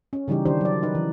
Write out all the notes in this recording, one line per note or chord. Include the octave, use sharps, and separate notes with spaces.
C#4
C#3 E3 G3 D#4 G4
D#3 D4 G4 C5
F#3 D5
D#4 B4
E3